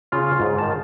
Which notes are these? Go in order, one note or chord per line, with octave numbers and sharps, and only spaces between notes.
C#3 F4 F5
G#2
D#3 A5